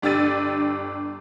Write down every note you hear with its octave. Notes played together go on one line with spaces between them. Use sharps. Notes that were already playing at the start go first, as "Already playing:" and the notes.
G1 D4 G4 E6 A6 D#7